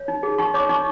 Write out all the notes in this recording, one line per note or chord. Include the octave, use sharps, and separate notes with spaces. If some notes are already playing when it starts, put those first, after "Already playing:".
Already playing: C#5
D#4
G#4
D#4 C#6
C#5 D6
D#4 C#6